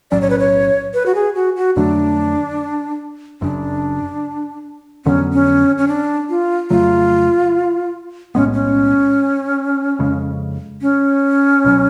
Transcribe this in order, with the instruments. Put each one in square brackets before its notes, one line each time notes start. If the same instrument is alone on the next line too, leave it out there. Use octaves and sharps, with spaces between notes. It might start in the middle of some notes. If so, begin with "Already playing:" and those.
[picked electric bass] B1 A2 F#3 C#4 [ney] D5
[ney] C#5
B4
C#5
B4
F#4
G#4
F#4
F#4
[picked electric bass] F2 D3 F#3 A3 [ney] D4
[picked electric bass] F#1 F#2 C#3 [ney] D4
[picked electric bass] F2 D3 F#3 B3 [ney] C#4
[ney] C#4
C#4
D4
F4
[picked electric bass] F2 C#3 F#3 A3 [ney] F4
[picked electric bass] B1 A2 G#3 B3 [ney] C#4
[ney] C#4
[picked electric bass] F2 C#3 G#3
[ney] C#4
[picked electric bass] C#2 B2 F#3